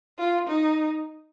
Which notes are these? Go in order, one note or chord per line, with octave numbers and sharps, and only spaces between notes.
F4
D#4